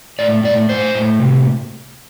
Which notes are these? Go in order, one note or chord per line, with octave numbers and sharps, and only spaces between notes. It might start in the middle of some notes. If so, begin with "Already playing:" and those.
A2 D5
A2 D5
A2 C5
A2
C3